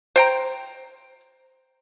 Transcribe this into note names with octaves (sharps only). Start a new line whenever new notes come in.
C5 G5 A#5